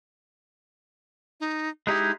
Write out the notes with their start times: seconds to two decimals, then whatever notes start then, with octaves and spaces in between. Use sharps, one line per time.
1.40 D#4
1.87 G#3 D#4 E4 G4